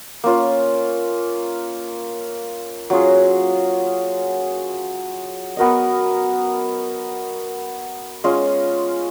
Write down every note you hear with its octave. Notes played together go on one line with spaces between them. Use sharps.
A#3 C#4 F4
F#3 C#4 F4 G#4
B3 F#4 A#4 D#5
G#3 C#4 F4